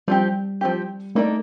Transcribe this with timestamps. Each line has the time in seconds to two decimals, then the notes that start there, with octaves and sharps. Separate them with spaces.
0.08 F3 G3 C4 G4
0.61 F3 C4 G4
1.15 A3 A#3 D#4 A4 D5